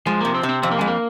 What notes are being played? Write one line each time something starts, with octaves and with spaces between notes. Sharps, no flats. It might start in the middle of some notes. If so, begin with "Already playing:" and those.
F3 G#3
C3 A#3
C4
C3
C4
F2 C4
A#3
F2 G#3
A#3